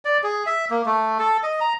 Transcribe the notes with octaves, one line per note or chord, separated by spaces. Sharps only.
D5
G#4
E5
A#3
A3
A4
D#5
A#5